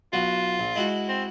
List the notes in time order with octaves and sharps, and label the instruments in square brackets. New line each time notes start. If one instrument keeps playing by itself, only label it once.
[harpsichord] B1 F#4 [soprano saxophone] F4
[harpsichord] A#1
G#3 E4 F#4
[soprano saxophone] C4